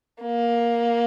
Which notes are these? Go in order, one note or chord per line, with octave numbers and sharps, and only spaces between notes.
A#3